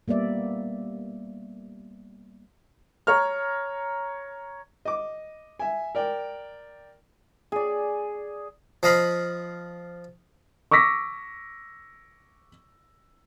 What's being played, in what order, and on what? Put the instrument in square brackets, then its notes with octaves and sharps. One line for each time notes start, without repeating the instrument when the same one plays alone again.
[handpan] G3 A#3 B3 D5 E5
[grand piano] C#5 A#5 F6
[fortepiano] D#5 D6
E5 G#5
A#4 D5 G5
[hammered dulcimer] G#4 D5
[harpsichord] F3 D#5 F5 B5
[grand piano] C#6 D6 E6 A#6 B6